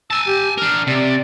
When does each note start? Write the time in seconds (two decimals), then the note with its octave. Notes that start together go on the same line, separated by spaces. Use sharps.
0.10 G#5 A5 E6
0.26 G4
0.58 D4 A#4 F6
0.87 C3 D5